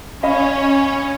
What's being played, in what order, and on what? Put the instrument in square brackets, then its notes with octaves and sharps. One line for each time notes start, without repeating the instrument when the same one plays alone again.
[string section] C#4 [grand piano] D#5 F5 B5